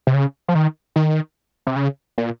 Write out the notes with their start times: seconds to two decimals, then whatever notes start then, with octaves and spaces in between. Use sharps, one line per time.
0.07 C3
0.14 C#3
0.48 F3
0.55 D#3
0.96 D#3
1.67 C3
1.76 C#3
2.18 A#2